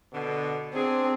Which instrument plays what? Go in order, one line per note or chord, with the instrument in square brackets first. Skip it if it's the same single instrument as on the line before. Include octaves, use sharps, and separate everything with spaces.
[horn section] B2 D3
[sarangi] C4 [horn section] D4 G#4